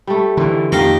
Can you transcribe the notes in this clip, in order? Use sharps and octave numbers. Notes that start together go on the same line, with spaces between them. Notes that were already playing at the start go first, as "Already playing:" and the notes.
G3 A3
D3 E3
F2 D#3 A#3 G4 F5 A#5